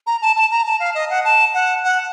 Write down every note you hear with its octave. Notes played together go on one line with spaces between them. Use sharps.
A#5
A5
A5
A#5
A5
F5
D#5
F#5
A5
F#5
F#5